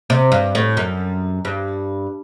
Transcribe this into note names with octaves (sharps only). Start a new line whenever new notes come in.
C3
G2
A2
F#2
G2